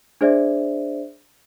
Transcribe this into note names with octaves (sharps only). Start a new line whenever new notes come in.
D4 G#4 C5 D5 E5